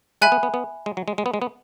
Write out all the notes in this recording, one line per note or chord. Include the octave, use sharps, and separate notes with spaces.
G#3 E5 G#5 B5 F#6
B3
B3
B3
G#3
F#3
G#3
G#3
B3
G#3
B3